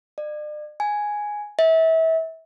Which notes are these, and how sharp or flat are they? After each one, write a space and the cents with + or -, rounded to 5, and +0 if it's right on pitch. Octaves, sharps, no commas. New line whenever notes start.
D5 +40
G#5 +0
E5 -30